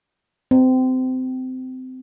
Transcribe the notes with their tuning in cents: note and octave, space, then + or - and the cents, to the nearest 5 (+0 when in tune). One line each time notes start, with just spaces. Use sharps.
C4 -25